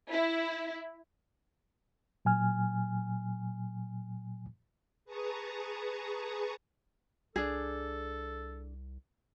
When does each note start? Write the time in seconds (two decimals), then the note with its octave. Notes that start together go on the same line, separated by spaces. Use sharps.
0.10 E4
2.25 A#2 F#3 G#5 F6
5.05 G#4 B4 A5 A#5 C#6 D#6
7.36 C2 D4 G#4 A4